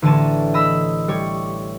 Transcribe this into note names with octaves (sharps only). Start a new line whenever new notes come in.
A1 D3 E3 C#5 A5 D#7
D#5 B5 E6
G3 C#5 C#6